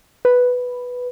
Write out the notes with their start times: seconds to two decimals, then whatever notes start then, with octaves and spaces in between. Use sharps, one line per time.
0.25 B4